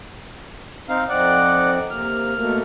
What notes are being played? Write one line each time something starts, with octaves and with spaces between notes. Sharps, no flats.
C4 D#4 F5
F2 C4 D#4 D5 F#5
C3 A#3 F6
B2 A3 A#3